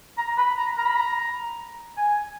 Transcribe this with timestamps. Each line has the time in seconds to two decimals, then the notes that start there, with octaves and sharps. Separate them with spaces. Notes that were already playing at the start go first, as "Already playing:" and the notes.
0.18 A#5
0.38 B5
0.58 A#5
0.78 A#5
0.86 B5
0.96 A#5
1.97 G#5